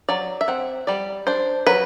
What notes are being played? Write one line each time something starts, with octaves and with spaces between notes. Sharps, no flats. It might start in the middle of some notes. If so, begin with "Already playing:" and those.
F#3 D5
E5
C4 F#5
G3 D5
D4 C5
F#3 B4